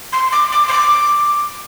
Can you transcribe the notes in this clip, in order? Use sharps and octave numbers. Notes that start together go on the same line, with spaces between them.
C6
D6
D6
C6
D6